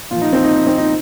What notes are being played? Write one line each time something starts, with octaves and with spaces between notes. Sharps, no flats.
A#2 F3 F4
D#4
C4
D#4
C4
D#4